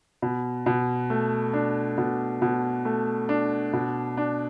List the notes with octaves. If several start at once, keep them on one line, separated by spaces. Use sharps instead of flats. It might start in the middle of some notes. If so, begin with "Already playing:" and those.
B2
B2
A3
D4
B2
B2
A3
D4
B2
D4